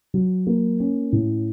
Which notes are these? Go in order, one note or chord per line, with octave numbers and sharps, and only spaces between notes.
F#3
A#3
C#4
A2